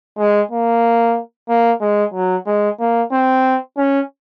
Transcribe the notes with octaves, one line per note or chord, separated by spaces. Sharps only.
G#3
A#3
A#3
G#3
F#3
G#3
A#3
C4
C#4